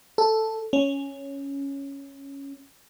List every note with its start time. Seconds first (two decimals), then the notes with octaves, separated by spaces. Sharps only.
0.18 A4
0.73 C#4